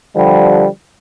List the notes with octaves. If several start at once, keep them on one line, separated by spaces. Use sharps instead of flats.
D3 F3 G3